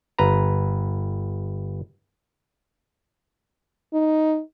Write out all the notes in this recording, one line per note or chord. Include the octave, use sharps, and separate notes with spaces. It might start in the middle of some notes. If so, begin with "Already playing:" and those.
G1 B4 A#5
D#4